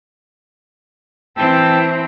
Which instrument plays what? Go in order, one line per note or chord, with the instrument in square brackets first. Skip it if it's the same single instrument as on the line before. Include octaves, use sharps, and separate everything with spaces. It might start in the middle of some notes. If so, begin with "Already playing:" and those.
[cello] E3 C4 [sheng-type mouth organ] G5 A5 E6